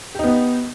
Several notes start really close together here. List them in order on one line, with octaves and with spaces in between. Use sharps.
G4 D#4 B3